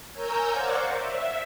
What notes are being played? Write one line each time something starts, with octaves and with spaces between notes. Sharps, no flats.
A#4 C#5 G#5 A#5 E6 G6
C5 D5 F5 F#5 C#6 D6
E5